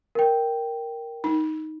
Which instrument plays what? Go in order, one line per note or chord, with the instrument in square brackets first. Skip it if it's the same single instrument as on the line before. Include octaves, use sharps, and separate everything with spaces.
[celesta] A#4 G5
[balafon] D#4